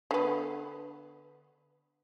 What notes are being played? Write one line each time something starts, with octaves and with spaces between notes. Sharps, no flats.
D3 B3